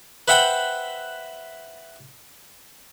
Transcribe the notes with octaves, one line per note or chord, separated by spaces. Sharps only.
B4 C5 E5 F#5 G5 B5